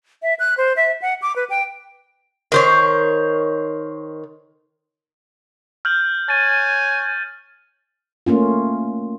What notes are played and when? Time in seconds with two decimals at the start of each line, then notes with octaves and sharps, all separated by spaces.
0.22 E5
0.39 F#6
0.57 C5
0.76 E5
1.02 F#5
1.22 D6
1.36 B4
1.50 G5
2.52 D#3 C5 C#5
5.85 F6 G6 F#7
6.29 C#5 G#5 A6 D#7
8.26 A3 A#3 C#4 F4